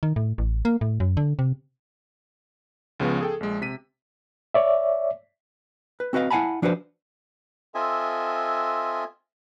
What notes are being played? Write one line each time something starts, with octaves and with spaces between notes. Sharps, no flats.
D#3
A2
A1
A#3
A2
F#2
D3
C3
C#2 C#3 F3 B3
G#4 A4 G5
A#1 G#3
C3 B6 D#7
C#5 D5 E5
B4
C4 F#4 B4 D#5 F5
E4 F5 F#5 G#5 A5 B5
F3 D4 F#4 G#4 B4 C5
C4 F4 A4 D#5 E5 G#5